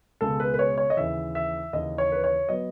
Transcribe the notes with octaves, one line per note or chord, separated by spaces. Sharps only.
C#2 B2 G#3 A4
B4
B4
C#5
C#5
D#5
D#2 C#3 E3 E5
E5
D#2 C#3 E3 D#5
C#5
B4
C#5
F#3 B3 D#5